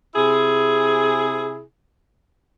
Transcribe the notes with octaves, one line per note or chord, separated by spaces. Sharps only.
C3 E4 G#4